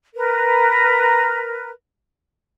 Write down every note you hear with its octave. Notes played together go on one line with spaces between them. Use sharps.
A#4 B4